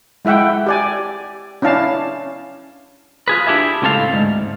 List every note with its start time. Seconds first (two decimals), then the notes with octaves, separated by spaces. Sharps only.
0.25 G#3 E4 E5 F#5 G5
0.67 G4 D5 G#5
1.62 C#4 D4 E4 F5 A5
3.28 F4 G#4 B4
3.47 D4 E4 G4 G#4 E5
3.82 C#2 A2 C4 A4 F5
4.13 D2 G#2